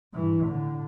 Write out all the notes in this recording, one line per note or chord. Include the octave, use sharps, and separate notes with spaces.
G2 E3
A2 D3